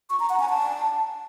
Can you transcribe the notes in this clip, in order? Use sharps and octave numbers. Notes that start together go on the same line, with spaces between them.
C#6
A#5
F#5
G#5
A5